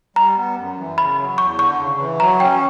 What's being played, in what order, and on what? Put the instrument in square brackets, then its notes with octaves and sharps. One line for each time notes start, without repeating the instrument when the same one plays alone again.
[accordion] G3 [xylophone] A#5
[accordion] B3
F#2
E3
[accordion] C#3 [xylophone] B5
[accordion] F#3
[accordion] E2 [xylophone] C#6
[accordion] D3 [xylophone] C#6
[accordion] C#3
E3
[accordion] F#3 [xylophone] A#5
[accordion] C#4 [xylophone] G5